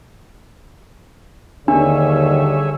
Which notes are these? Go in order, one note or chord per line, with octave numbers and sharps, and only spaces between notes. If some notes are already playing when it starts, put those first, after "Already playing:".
D#2 D3 G3 D4 G#4 C#5 E5